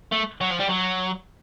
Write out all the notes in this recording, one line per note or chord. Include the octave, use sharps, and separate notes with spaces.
A3
F#3
F3
G3
F#3